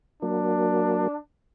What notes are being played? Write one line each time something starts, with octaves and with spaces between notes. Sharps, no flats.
F#3 A#3 D4